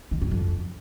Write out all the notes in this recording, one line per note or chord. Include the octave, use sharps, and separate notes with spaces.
D#3
G2
F2